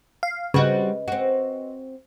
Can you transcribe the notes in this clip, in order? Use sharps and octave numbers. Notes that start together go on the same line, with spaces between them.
F5
C#3 G3 C4 F#4 B4 D#5
C4 F#4